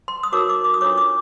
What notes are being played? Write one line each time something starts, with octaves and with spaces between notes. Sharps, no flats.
C6
D#6
D#4 F#4 A#4 C#5 D6
D6
D6
D#6
D4 F4 A4 C#5 D6
D6